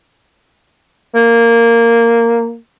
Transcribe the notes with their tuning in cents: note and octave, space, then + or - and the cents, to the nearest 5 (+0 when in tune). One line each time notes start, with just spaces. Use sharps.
A#3 -10